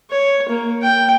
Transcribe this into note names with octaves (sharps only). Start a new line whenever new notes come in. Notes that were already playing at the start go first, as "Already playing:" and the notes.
C#5
A#3
G5